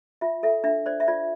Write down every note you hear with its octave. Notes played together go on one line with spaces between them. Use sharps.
F4 E5
A4 E5
D4 E5
C5 D5
E5
F4 D5